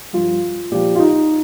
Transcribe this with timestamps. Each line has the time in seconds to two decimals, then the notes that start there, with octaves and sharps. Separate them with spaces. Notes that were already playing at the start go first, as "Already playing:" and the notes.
0.13 G2 F3 F4
0.71 A#2 F3 G4
0.95 F4
0.99 D#4